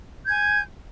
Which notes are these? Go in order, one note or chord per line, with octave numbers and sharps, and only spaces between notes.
G#5 G6 G#6